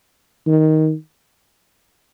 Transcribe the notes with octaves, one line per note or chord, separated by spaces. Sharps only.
D#3